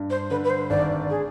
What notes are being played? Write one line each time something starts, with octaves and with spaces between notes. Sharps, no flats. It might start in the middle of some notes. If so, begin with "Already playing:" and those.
Already playing: G2
C5
D3 B4
B4
C5
G#1 D5
G#4